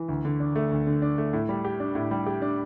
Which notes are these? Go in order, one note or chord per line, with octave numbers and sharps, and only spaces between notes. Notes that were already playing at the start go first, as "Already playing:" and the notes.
Already playing: E3
D2
D3
D4
A3
D2
D3
D4
A3
A2
G3
G4
D4
A2
G3
G4
D4